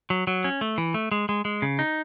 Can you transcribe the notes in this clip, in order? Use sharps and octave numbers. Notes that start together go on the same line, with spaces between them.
F#3
F#3
C#4
A3
E3
A3
G#3
G#3
G#3
C#3
D#4